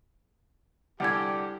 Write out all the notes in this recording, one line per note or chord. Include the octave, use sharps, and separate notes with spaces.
C2 D3 G4 F#5 G#5 G#6